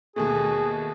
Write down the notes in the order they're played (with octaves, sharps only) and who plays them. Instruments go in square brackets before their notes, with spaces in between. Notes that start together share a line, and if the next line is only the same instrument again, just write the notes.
[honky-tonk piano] D#2 B2 A3 [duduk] G#4